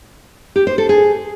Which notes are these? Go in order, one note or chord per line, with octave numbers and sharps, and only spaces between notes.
G4
C5
A4
G#4